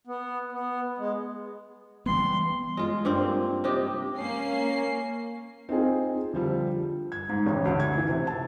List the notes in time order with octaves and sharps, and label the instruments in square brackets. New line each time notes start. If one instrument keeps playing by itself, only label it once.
[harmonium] B3
B3
G#3
[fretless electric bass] E3 G3 B3 [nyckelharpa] C6
[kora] G#3 F4
G2 A#3 C4
C3 D#4 G4
[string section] A#3 C#4 C7
[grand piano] C4 D#4 F4 G#4
D3 F3 G3
[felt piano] G#6
G#2
A1
D2
G#6
E3
C3
A5